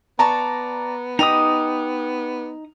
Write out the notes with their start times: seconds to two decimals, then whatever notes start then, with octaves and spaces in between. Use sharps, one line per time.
0.19 B3 D5 A5 A#5 C#6
1.19 D#4 G4 D#5 B5 D#6 F7